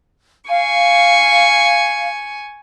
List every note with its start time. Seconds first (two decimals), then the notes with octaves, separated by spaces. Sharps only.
0.50 F5 G#5 C#6